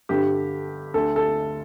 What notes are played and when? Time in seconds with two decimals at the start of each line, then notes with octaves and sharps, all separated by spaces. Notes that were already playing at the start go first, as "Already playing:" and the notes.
0.09 G1 G2 D3 G4
0.94 D2 D3 A4
1.16 A4